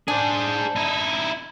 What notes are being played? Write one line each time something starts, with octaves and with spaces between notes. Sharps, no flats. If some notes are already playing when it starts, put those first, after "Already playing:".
D4 G#4 C5
D#4 E4